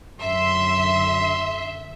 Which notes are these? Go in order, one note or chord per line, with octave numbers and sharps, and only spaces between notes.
F#2 D3 E5 C6